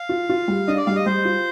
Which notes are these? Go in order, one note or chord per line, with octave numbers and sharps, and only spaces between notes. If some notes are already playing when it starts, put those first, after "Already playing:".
Already playing: F5
F4
F4
G3
D4 D#5
D5
G3 F5
D#5
G3 C5
F4